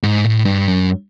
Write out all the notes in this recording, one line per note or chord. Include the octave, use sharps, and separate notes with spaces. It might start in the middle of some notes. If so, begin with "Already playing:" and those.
G#2
A2
G2
F#2